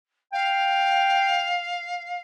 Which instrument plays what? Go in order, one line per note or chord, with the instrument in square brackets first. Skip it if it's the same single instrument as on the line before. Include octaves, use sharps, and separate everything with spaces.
[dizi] F5 [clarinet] G5